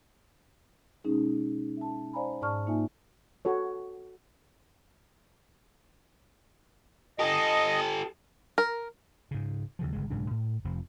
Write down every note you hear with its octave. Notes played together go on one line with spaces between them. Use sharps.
B2 G#3 C#4 D#4 G#4
E5 A5
C5 D5 F5 G#5 A#5 B5
G#2 D5 A5 C#6 F6
A#3 D#4 F4 E5 G#5
F#4 A4 C#5
G4 A4 D#5
A#4
G#2 C#3
D#2 C#3 F3
G1 C#3 G#3
B1 G#2 C#3 D4
A2
F1 F2 F3